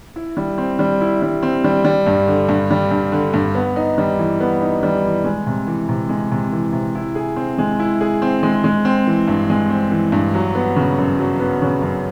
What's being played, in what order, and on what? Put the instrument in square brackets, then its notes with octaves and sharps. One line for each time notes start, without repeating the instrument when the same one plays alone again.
[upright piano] E4
G3
C4
G3
E4
G3
C4
G3
G3
G2
D3
G2
G3
G2
D3
G2
B3
D#4
G3
E3
B3
D#4
G3
E3
G#3
C3
E3
C3
G#3
C3
E3
C3
E4
G#4
C4
G#3
E4
G#4
C4
G#3
G#3
C4
E3
G2
G#3
C4
E3
G2
F#3
B3
C#3
F#2
F#3
B3
C#3
F#2